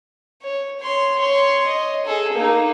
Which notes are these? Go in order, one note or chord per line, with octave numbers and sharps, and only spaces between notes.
C#5
C#5 C6
C#5 C6
D#5
G#4 A4
A#3 D#4